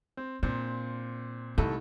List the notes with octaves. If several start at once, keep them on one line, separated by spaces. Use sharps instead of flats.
C4
A#2 C4 D4
C2 A3 D#4 A4